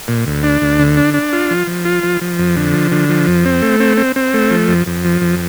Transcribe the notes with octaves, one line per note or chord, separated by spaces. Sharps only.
A#2
D2
D4
D2
D3
D4
D4
F4
F3
F3
F4
F3
F3
F2
D3
F3
D3
F3
F2
C4
A3
C4
C4
C4
A3
F3
F2
F2
F3
F2